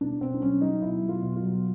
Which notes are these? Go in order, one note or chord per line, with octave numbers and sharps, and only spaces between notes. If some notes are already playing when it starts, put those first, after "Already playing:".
B2 D4
B2 C4
D4
F#3 C#4
F#3 D#4
B2 E4
F#3
F4
B2
F4
F#3